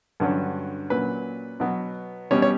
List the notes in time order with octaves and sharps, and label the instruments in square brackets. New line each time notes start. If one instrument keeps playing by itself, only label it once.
[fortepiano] G2 D3 F#3 C#4
A#2 F#3 C#4 B4
B2 F#3 B3
B2 G3 C#4 C#5
C#5